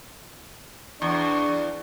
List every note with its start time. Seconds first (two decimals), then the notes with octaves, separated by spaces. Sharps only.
1.02 E2 D4 C#6